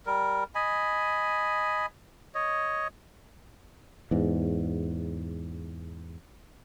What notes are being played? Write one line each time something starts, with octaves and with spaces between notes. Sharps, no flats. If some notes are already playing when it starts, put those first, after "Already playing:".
G3 A#4
D#5 G#5 B5
C#5 D#5
E2 G#2